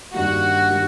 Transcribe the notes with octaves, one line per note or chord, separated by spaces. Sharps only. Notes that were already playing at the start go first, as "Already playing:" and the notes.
G2 D#3 G3 A#3 F#4
D#3 G3 A#3